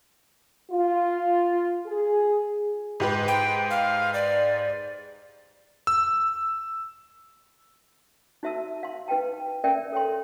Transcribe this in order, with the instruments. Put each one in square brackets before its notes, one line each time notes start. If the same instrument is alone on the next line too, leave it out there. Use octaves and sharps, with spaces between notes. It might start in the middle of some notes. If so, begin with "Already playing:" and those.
[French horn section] F4
G#4
[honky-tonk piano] G#2 G4 B4
[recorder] G5
F5
D5
[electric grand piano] E6
[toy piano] D#4 F#4 E5 A5 E6
F5 C6
D#4 B4 F5 G5 A5
C#4 A#4 D5 E5 G5
A4 C#5 G5 C6